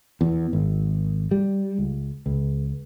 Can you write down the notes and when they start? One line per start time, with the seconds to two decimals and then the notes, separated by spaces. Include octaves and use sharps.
0.21 E2
0.53 G#1
1.31 G3
1.78 C#2
2.26 C#2